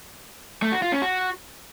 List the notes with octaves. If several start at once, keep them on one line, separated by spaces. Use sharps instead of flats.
A3
F#4
F4
C#4
F#4